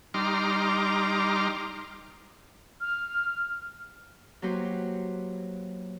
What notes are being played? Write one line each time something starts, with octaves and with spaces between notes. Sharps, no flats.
G3 D#4 A#5 C6 D6 F6
F6
F#3 A#3 F#4 G4 B4 C5